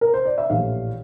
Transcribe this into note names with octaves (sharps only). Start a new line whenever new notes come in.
A#4
C5
D5
E5
A#1 A2 E3 G3 F5